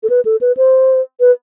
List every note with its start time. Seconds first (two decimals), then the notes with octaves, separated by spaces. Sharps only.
0.03 A4
0.10 B4
0.25 A4
0.41 B4
0.57 C5
1.20 B4